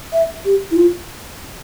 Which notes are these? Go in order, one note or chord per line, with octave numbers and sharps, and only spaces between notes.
E5
G4
E4
F4